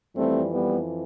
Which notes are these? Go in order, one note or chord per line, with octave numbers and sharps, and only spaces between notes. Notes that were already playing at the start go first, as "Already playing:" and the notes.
F2 E3 G3 A3 C4
G3 B3